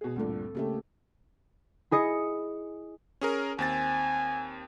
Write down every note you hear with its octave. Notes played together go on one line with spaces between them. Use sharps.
B2 G#4
D2 G2 A#2 C4 A4
C#3 A3 A#3 G4 A4
E4 G#4 D#5 C#7
C#4 G#4 A#4
D#2 C4 G#5 A6